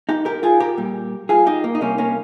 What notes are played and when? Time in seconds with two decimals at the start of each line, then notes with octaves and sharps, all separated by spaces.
0.09 D#4 G4
0.25 G4 A#4
0.43 F4 G#4
0.60 G4 A#4
0.77 A#2 G3
1.29 F4 G#4
1.46 D#4 G4
1.64 A#3
1.75 D#4
1.81 C3 G3 A#3 C#4
1.98 A#3 C#4